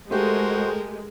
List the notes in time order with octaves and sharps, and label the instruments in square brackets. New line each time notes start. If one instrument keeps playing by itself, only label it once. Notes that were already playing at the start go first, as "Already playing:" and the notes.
[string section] G#3 [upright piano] A3 G4 [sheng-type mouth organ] F#4 C5 [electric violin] A4 A#4